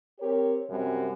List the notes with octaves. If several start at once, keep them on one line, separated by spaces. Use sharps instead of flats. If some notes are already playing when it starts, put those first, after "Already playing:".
C4 G4 A#4 C#5
F#2 C3 G3